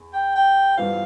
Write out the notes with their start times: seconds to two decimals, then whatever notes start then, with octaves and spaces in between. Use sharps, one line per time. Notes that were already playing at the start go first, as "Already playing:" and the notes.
Already playing: E2
0.13 G5
0.35 G5
0.77 G2 E3 B3 F4 C5 F5